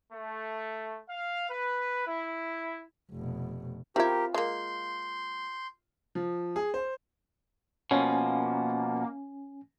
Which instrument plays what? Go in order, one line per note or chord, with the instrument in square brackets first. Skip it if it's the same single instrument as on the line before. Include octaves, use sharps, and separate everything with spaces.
[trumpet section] A3
F5
B4
E4
[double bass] F1 B2
[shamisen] C4 E4 [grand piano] F4 [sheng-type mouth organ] G4 A#4
[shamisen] G#3 A#3 [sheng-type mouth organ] C6 G6
[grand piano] F3
G#4
C5
[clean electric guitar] B2 F3 [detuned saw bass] A#3 [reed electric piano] C#4 G#5